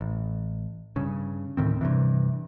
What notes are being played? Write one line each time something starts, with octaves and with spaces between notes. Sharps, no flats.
A1
G2 C#3
D2 A2 D#3 C4
G2 C3 E3